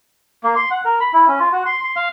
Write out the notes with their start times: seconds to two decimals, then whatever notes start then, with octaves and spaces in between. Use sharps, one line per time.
0.44 A#3
0.56 C6
0.71 F#5
0.85 A#4
1.00 B5
1.13 E4
1.28 C#4
1.40 F4
1.52 F#4
1.66 C6
1.82 C6
1.96 F5